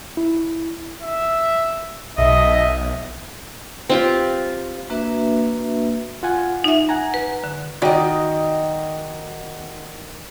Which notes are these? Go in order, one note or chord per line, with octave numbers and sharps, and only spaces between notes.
E4
E5
B1 D#5 E5
C4 F4 G4
A#3 D4 F#4 B4 E5
F4 F#5 G#5
D#4 E5
F#5 G#5 A#5
B4
D3
D#3 F#4 D5 D#5 G5